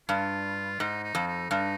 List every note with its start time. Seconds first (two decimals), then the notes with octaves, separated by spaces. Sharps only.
0.09 G2 F4
0.80 G#2 D#4
1.04 D#4
1.15 F2
1.27 D#4
1.50 G2 D#4